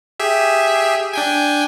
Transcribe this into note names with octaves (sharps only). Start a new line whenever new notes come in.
G4 G#4 E5
D4 G5 G#5